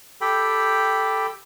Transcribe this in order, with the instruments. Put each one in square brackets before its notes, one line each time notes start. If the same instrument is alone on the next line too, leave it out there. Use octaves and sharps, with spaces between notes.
[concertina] G4 A4 G5 B5